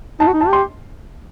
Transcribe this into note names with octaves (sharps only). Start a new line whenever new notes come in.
D#4 A5
F#4
D#4
A5
G4
C6